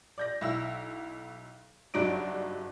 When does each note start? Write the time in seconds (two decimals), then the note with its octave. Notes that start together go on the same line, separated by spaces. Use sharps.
0.18 D5 G6 A#6
0.41 B1 E4 E6
1.94 F#1 G2 F#3 D#4 D5 D7